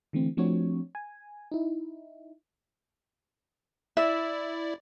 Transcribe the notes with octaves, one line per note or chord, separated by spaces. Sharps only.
D3 E3 A3 C4
F3 A3 C4 D4 F#4 C#5
G#5
D#4 E4
E4 D5 E5